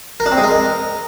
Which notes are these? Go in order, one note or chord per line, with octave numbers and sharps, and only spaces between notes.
A#4
D4
C4
G#3
A#4